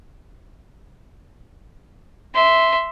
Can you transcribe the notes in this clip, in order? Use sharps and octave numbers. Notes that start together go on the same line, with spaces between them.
E5 C6